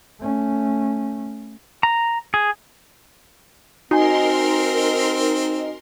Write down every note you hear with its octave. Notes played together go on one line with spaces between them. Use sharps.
A3 C#4
A#5
G#4
C4 D#4 F#4 A#4 G#5 C6